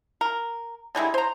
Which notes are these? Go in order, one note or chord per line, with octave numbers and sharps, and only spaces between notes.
A#4
D3 G3 G#3 E4
C5 A#5